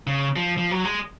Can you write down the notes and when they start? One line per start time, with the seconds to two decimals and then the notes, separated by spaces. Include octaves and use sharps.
0.07 C#3
0.36 F3
0.57 F3
0.71 F#3
0.85 G#3